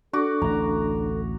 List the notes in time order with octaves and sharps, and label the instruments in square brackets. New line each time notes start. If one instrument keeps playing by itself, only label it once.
[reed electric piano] D4 [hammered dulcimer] F#4 D6 [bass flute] A4
[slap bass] A1 D2 [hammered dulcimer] A#5